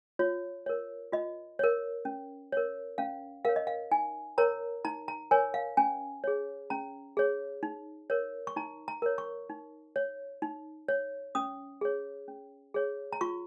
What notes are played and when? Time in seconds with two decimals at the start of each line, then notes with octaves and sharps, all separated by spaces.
0.19 F4 C#5
0.66 A#4 C#5
1.12 F4 D#5
1.59 A#4 C#5
2.05 C#4
2.52 A#4 C#5
2.98 C#4 F5
3.45 A#4 C#5 F5
3.56 D#5
3.67 F5
3.91 D#4 G#5
4.38 A#4 C#5 A#5
4.85 D#4 A#5
5.08 A#5
5.31 A#4 C#5 G#5
5.54 F5
5.77 C#4 G#5
6.24 G#4 C#5
6.70 C#4 A#5
7.17 G#4 C#5
7.63 D#4
8.10 A#4 C#5
8.47 C#6
8.56 D#4 A#5
8.88 A#5
9.02 A#4 C#5
9.18 C#6
9.50 D#4
9.96 C#5
10.42 D#4
10.88 C#5
11.35 C#4 D#6
11.81 G#4 C#5
12.28 C#4
12.74 G#4 C#5
13.13 A#5
13.21 F4 C#6